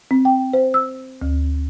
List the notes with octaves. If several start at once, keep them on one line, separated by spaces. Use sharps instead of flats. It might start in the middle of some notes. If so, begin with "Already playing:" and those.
C4
G5
C5
E6
D2